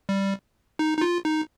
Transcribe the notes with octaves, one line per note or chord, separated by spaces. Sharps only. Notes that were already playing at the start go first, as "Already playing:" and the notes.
G3
D#4
D#4
F4
D#4